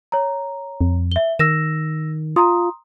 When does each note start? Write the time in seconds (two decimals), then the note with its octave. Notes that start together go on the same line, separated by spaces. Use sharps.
0.12 C#5 A#5
0.81 F2
1.12 E5 G7
1.39 D#3 E6 A#6 E7
2.36 F4 A#5 C6 D#6